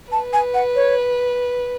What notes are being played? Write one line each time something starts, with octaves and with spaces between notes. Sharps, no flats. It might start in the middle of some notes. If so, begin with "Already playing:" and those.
B4 A5
G#5
F#5
C#5